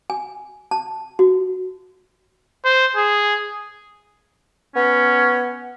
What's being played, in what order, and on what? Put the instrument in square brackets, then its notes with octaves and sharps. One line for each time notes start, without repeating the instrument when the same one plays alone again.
[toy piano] G#5
A5
F#4
[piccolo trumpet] C5
G#4
[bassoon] B3 [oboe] C#4